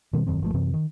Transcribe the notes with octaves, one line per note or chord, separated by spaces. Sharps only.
B2 D#3 G3 C4
E1 F#2 D#3 C4
G1 F3 A3
F#2 C3 E3 C4
D#3